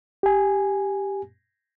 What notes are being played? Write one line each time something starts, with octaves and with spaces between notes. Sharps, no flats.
G4 G#5